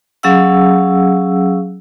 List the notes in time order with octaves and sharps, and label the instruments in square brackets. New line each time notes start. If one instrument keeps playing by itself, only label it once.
[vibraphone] F#3 C#4 G#4 F5 F#5 E6